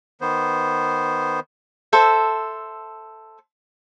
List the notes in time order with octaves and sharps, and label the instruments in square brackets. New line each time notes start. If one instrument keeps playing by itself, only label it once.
[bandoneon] D#3 B3 C5
[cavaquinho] A4 C5 E5